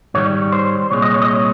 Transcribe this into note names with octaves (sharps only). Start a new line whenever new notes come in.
G#2 D#3 G3 C#5
C5
C2 A#2 G#3 C#5
D#5
C#5
D#5
C#5